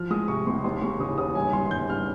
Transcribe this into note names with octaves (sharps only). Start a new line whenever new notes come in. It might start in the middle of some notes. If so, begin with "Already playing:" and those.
Already playing: F3 F6
G#3 D#6
C3 C#6
C#2 C6
D#2 C6
G#3 C#6
C#3 D#6
D#2 D#6
G1 G#5
G1 C6
G1 G6
G2 F6